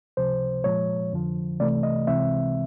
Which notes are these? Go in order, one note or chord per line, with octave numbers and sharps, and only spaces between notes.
C#2 C3 F3 C5
A#2 F3 G#3 C#5
F2 D3 F3
C2 C3 E3 A3 D5
D#5
C#2 C3 E3 G#3 C4 E5